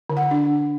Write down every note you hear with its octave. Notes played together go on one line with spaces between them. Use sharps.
D3
F#5
D4